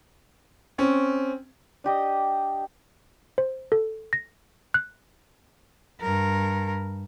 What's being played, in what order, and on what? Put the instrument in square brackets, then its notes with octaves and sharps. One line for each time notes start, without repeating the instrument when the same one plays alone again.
[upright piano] C4 C#4
[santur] D4 G4 D#5
[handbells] C5
A4
A#6
F#6
[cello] G2 A#4